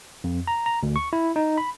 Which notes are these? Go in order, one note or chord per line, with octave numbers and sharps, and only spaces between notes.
F2
A#5
A#5
D2
C#6
E4
D#4
B5